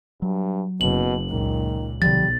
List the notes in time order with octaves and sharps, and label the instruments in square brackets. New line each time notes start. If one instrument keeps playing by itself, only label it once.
[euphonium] G2 [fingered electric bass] F#3
[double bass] F#1 [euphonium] B2 [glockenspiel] F#7
[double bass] C#2 A#2 [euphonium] D#3
[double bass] B1 [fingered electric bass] D3 F3 [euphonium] G3 [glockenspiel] A6